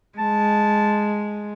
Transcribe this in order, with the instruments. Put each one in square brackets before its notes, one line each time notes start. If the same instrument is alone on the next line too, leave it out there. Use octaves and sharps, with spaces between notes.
[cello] G#3 [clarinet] A5